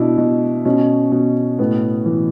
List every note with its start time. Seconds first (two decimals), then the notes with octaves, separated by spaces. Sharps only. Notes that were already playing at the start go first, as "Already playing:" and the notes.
Already playing: B2 D4 E4
0.18 B2
0.65 B2 C#4
1.12 B2
1.59 A2 B3
2.06 E3